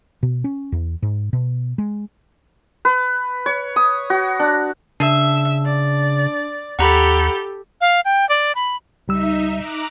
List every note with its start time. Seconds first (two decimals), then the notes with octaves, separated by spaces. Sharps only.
0.23 B2
0.44 C#4
0.72 E2
1.02 G#2
1.33 B2
1.78 G#3
2.85 B4
3.46 C#5
3.76 D#6
4.10 F#4
4.39 D4
5.00 C#3 D4 E5
5.66 D5
6.79 D#2 G4 A4 F#5 A#5 B5
7.81 F5
8.05 G5
8.29 D5
8.55 B5
9.08 C#2 G3 D#4 E5 E6
9.56 A#5 D6 F#6